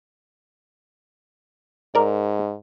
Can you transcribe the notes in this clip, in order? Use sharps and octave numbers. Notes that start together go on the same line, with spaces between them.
G#2 A#4 D5